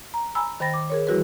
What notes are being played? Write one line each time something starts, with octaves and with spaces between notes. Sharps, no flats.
A#5
G#5 A#5 B5 E6
D#3 C5 G5 B5 A6 A#6
D6
G#4 A#4 C#5
E3 G3 E4 F#4 G#4 B4